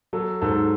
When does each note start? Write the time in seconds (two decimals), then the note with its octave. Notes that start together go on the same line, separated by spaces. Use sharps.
0.13 F#3 A4
0.41 G#2 A4